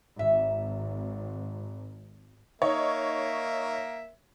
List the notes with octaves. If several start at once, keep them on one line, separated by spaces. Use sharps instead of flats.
G#1 E5
A#3 D#4 C#5 E5